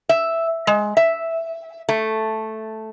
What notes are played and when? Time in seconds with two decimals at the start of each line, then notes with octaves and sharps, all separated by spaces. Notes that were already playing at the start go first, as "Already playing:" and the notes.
0.09 E5
0.67 G#3
0.97 E5
1.89 A3